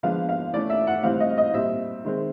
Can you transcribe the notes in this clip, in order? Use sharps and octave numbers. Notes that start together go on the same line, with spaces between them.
F3 G#3 B3 D4 F5
F5
E3 A3 C#4 D5
E5
F#5
A2 E3 G3 C4 F5
D#5
D#5
A#2 G3 C4 E5
D#3 G#3 C4